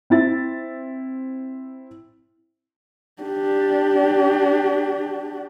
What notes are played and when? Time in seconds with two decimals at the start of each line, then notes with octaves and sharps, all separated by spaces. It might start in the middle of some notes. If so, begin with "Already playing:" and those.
0.10 C4 E4 A6
3.23 D4 G4